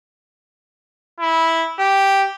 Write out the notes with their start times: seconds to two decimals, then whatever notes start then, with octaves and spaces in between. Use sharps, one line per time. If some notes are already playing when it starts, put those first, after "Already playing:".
1.20 E4
1.79 G4